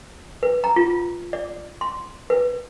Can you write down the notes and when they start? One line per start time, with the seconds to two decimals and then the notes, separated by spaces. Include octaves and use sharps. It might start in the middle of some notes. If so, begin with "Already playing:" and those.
0.43 B4
0.64 A#5
0.76 F4
1.33 D5
1.81 C6
2.30 B4